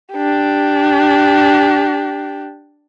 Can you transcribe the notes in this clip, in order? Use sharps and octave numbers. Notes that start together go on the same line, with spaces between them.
D4 G4